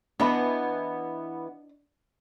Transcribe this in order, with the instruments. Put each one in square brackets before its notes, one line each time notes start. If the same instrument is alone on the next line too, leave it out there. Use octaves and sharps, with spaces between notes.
[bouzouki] E3 B3 [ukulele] D4 D#5 B5